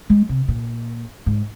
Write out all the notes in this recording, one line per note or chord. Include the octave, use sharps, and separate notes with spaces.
G#3
C3
A#2
G#2